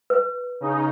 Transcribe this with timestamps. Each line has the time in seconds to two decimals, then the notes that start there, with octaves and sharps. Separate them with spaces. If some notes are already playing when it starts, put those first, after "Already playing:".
0.10 B4
0.61 C#3 D#4